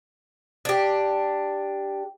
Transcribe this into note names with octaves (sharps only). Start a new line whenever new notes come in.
D4 G4